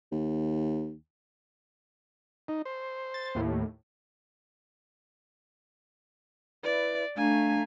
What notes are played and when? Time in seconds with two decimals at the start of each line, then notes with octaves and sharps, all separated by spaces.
0.12 D#2
2.48 D#4
2.65 C5
3.14 A6
3.35 D#2 A2
6.64 E4 B4 D5 E5
7.17 A3 D4 F5 G#5 A#5